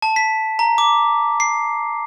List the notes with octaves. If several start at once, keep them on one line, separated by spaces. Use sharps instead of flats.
A5
B6
A#5
D6
C7